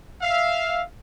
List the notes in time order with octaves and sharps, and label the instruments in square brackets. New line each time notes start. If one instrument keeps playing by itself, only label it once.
[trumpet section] E5 F5